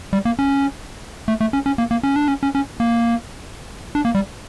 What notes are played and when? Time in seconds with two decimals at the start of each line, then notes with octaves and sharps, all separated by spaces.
0.13 G3
0.25 A#3
0.39 C#4
1.28 A3
1.41 A3
1.53 C#4
1.66 C#4
1.78 A#3
1.91 A#3
2.03 C#4
2.16 D4
2.28 C#4
2.43 C#4
2.55 C#4
2.80 A#3
3.95 D4
4.05 A#3
4.15 G3